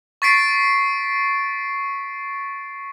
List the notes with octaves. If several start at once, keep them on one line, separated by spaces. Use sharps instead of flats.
C#6 A6 B6 C7 D7